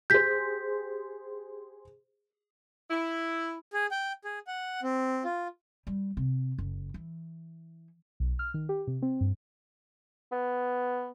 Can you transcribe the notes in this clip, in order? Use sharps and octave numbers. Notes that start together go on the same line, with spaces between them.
G4 G#4 C5 G6 B6
E4
G#4
G5
G#4
F#5
C4
F4
G3
C3
F#1
E3
B1
F6
D#3
G4
C3
C4
G2
B3